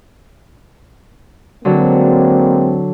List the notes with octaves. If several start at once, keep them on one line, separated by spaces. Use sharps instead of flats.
D3 F#3 G#3 A#3 C4